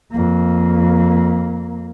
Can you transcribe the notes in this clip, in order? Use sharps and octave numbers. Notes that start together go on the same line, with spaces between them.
F2 A#3